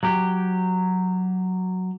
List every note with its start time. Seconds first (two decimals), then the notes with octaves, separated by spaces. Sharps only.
0.03 F#3 G4